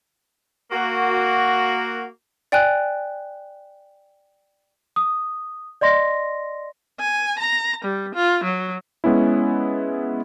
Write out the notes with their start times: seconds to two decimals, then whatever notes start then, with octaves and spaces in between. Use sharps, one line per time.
0.71 A#3 F#4
2.52 D5 G5 G#5 F#6
4.96 D#6
5.81 D5 D#5 C6 A#6
6.99 G#5
7.39 A#5
7.84 G3
8.15 F4
8.43 F#3
9.04 G#3 B3 C#4 E4